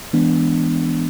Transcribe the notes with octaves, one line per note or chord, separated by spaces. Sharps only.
E3 G#3 B3 D4